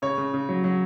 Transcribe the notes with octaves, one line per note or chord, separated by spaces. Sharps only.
C#3 C#5
C#3
C#3
F#3
F#3